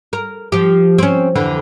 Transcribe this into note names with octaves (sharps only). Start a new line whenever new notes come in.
A#4
F3 G4
C4 C#4
F2 D3 E3